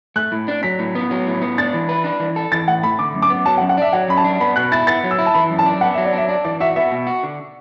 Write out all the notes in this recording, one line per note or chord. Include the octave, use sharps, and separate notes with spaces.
A3 F#6
A2
D4
F#3 B6
A2
B3
F#3
A2
B3
D4 A6
E3
B4
D4
E3
A4
E3 A6
A2 F#5
A3 B5
D3 D6
F#2
D6
B3
F#3 A5
F#5
F#2
F#5
D4 D5 E5
F#3 F#5
F#2 B5
A5
D4
B3 B5
B2 F#6
E4 A6
B3 A6
F#3
E6
E4
A5
E3 B5
F#2
A5
D4
B3 F#5
E5
F#3
D5
D4
E5
D4 D5
E3 D5
F#4 E5
B3 E5
B2
F#4
D3